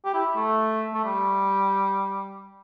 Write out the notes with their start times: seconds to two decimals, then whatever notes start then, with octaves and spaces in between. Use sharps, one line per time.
0.05 G4
0.14 E4
0.36 A3
0.94 A3
1.05 G3